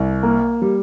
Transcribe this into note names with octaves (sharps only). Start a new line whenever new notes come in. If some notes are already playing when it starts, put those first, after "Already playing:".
Already playing: C2
A#3
G3